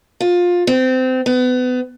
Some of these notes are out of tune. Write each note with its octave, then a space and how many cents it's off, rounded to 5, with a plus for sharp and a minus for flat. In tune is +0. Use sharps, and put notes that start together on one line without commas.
F4 +20
C4 -25
B3 +30